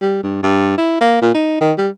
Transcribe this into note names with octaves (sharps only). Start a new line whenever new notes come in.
G3
G2
G2
E4
A#3
A#2
D#4
D#3
G3